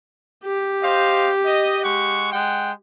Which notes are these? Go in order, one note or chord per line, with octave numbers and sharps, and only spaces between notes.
G4
C5 D#5 F5
D#5
G#3 F#5 C#6
G#3 F#5 G5